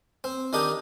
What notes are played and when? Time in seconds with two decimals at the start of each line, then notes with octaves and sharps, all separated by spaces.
0.24 C4
0.53 D#3 D4 D#4 G4